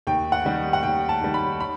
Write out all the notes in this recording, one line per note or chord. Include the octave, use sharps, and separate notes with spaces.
D#2 G5
F#5
D#3 G3 D#4
F#5
D#2 G5
A5
D#3 G3 D#4
B5
B5